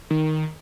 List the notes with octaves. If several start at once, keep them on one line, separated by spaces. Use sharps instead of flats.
D#3